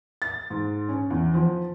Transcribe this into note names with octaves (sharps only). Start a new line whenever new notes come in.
A6
G#2
C#4
E2
F3